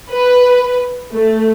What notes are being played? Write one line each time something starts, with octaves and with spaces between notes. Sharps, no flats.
B4
A3